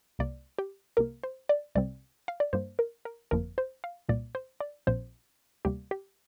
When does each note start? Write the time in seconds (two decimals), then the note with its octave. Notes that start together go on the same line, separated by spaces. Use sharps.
0.19 C2 C3 A#3 D5
0.59 G4
0.97 C2 C3 A#3 A#4
1.23 C5
1.49 D5
1.75 C2 C3 G3 C4 D5
2.28 F5
2.40 D5
2.53 G2 G3 A#3 C5
2.79 A#4
3.05 A#4
3.31 G1 F2 F3 A#3 A#4
3.58 C5
3.84 F5
4.09 C2 A#2 G3 A#3 D5
4.35 C5
4.60 D5
4.87 A#1 A#2 F3 C4 C5
5.65 D2 C3 G3 A#3 G4
5.91 G4